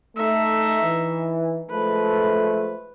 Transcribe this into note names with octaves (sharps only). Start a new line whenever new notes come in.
A3 D#4 E5
E3
F3 G#3 A3 B4